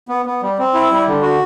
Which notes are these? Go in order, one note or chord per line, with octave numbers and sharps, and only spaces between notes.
B3
B3
G3
C4
E4
G3
D3
F#4